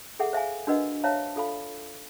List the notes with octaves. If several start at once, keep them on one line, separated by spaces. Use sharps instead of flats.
G#4 A4 E5 F#5
C5 E5 F5 G#5
D4 F#4 A#4 B4 D#5 F#5
C5 C#5 E5 F5 A5 A#5
F4 A4 F5 B5